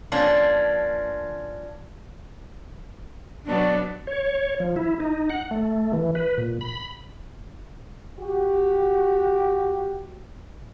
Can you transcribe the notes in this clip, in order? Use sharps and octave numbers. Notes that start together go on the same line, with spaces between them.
F3 A#3 C#4 D4
B2 F#3 B3 D4
C#5
F3
E4
D#4
F#5
A3
E3
B4
A#2
B5
F#4 G4